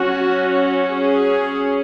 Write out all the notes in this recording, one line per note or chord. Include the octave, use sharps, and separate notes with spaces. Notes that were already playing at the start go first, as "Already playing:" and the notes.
Already playing: F#3 C#4 F#4
G#4